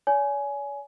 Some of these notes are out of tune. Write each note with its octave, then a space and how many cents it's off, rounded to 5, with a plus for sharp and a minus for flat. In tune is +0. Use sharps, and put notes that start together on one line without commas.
C#5 +45 G#5 +15